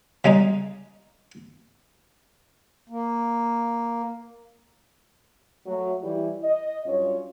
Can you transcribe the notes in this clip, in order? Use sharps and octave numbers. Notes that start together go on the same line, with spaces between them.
C#3 G3 G#3 D#4
A#3
F#3 A3
E3 G3 E4
D#5
G2 F#3 C#4 F4 C#5